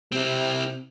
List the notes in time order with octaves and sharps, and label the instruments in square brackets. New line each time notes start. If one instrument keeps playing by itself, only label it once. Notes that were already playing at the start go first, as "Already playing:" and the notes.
[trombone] C3 [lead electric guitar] C4 E4